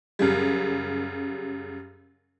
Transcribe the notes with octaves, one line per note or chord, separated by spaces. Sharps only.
F#2 C#3 G3